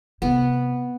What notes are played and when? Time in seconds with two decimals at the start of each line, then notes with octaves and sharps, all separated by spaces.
0.22 C3 B3